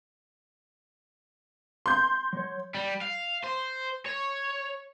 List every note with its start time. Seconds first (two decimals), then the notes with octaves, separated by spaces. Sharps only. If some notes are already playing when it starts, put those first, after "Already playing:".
1.86 C6 G6
2.33 F#3 C#5
2.75 G3
3.02 F5
3.44 C5
4.06 C#5